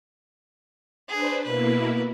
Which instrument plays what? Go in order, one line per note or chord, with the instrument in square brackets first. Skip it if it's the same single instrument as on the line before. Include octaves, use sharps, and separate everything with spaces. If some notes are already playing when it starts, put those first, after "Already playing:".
[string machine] D4 B4 C5 [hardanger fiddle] G#4
[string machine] B2 A#3 E4 [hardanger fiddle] B4